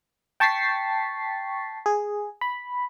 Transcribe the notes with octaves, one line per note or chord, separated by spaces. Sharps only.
G5 A5 C#6 A6 B6 C7
G#4
B5